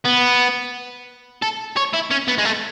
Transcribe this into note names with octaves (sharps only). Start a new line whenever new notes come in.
B3
A4
C#5
E4
C#4
B3
G#3
A3